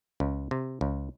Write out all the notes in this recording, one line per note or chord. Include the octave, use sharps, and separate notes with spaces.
C#2
C3
C#2